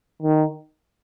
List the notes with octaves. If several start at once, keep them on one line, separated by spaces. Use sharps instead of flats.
D#3